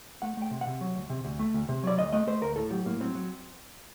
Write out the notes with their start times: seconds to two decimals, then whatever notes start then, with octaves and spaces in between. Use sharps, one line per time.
0.22 A3 F#5
0.37 A3 G5
0.51 C3
0.61 F#5
0.67 C3
0.81 F#3
0.95 D2
1.10 C3
1.25 D2
1.39 A3
1.54 D2
1.69 C3
1.83 F#3 D5
1.98 D2 D#5
2.13 A3 D#5
2.27 A3 C5
2.42 D2 A#4
2.56 A2 A4
2.71 F#3 G4
2.86 A2 A#3
3.01 F#3 C4
3.15 F#3